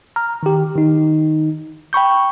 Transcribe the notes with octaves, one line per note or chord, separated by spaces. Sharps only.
A#5 F6
D#3 G4
D#3 D#4
G5 B5 C#6 G6